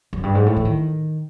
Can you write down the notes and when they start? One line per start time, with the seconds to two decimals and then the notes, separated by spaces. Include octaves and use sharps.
0.13 F#2
0.23 G2
0.35 G#2
0.46 A2
0.56 E3
0.65 D#3